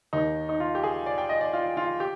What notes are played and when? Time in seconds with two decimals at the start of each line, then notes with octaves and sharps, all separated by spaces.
0.13 D#2 D#3 D#4
0.49 D#4
0.60 F4
0.75 G4
0.84 G#4
1.06 D5
1.18 G5
1.29 D#5
1.41 D5
1.53 F4
1.77 F4
2.00 G4